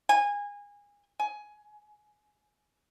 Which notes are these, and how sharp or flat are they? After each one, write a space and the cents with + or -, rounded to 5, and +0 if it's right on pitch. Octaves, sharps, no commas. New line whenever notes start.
G#5 -25
G#5 +15